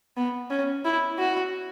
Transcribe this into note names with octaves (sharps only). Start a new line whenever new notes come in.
B3
C#4
E4
F#4